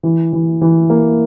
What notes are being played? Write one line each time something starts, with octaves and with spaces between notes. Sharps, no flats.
E3
E3
E3
A#3